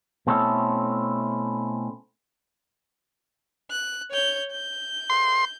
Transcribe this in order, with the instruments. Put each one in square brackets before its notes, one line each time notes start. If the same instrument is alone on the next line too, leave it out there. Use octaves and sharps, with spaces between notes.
[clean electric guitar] B2 A3 C4 C#4 E4 A4
[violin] F#6
C#5 G6
G6
[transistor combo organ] C6